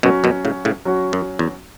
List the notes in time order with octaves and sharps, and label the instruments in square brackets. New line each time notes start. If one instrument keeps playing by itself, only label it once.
[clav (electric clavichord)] F#2 B2 [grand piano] F#3 C#4 F#4
[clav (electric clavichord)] F#2 B2
A2 C#3
A2 C#3
[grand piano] F#3 C#4 F#4
[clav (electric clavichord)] F#2
E2